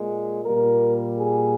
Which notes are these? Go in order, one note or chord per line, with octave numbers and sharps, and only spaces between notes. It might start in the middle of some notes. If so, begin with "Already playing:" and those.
Already playing: A#2 G#3
A#2 G3 A#3 A#4
G#4